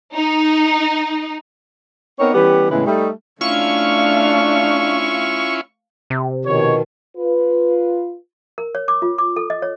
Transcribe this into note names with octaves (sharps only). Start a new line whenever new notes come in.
D#4
B3 C4 D#4 A#4 C#5
E3 G3 B3 C#4 G4
A2 C#3 E3 G#3 B3 B4
G3 A3 D#4
A3 C#4 D4 E4 F4 F5 C#6
C3
B2 D#3 F3 B3 C#5
F4 B4
A#4
C#5
D6
F4
D6
A4
D#5
C#5